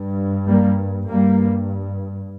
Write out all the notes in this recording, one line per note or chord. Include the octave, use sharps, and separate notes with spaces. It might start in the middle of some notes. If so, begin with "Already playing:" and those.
Already playing: G2
G3 A#3
G2 G3 A#3